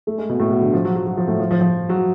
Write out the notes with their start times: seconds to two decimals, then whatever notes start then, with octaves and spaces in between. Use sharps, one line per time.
0.07 A3
0.18 G#3
0.29 B2
0.40 A2
0.50 B2
0.62 D3
0.74 F3
0.85 F#3
0.96 F#3
1.07 F#3
1.17 F3
1.28 A2
1.39 F3
1.51 F3
1.61 F3
1.89 F#3